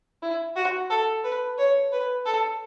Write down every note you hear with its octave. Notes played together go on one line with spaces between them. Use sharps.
E4
F#4
A4
B4
C#5
B4
A4